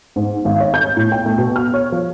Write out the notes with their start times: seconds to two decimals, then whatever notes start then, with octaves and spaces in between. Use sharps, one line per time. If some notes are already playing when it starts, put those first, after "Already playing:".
0.16 G#2
0.45 G#1
0.60 C#5
0.74 G6
0.97 A2
1.12 G5
1.26 A3
1.38 B2
1.56 F6
1.74 C#5
1.92 F3